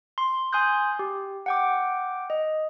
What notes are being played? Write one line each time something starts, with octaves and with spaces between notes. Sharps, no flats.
C6
G#5 C6 D#6 F#6 G6
G4
F#5 G5 D6
D#5